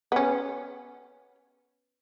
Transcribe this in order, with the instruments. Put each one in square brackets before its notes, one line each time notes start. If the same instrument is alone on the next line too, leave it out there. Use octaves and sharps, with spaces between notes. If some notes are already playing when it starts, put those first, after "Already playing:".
[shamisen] B3 C#4